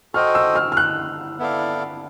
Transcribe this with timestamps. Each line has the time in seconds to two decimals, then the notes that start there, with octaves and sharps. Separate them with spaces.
0.14 F#4 A4 C5 D#5 G5 F6
0.35 E6
0.56 F6
0.72 F6
0.77 F#6
1.39 B3 E4 A4 D5 F5